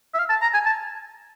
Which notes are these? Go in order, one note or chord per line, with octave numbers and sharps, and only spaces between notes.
E5
F5
A5
A#5
G#5
A5